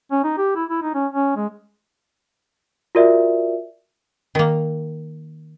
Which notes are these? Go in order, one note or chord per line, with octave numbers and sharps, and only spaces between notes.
C#4
D#4
G4
E4
E4
D#4
C#4
C#4
G#3
F4 F#4 A#4 D5 E5
D#3 A#3